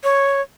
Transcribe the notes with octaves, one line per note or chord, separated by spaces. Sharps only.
C#5